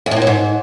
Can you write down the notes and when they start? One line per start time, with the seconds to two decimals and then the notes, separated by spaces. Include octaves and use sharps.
0.06 E2
0.11 A2
0.17 A#2
0.22 F#3
0.27 G#2